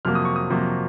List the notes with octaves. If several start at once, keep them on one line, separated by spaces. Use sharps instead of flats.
F2 C3 F#3 A#3 F6
D#6
C#6
D#6
F2 C3 F#3 A#3